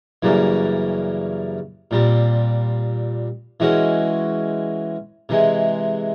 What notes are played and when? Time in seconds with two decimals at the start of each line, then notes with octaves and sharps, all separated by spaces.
0.22 F#2 C#3 E3 G3 A#3
1.91 A#2 G3 C4
3.60 E3 G#3 C#4 F#4
5.29 C3 E3 G#3